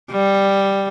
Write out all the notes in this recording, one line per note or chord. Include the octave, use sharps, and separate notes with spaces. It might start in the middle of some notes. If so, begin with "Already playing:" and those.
G3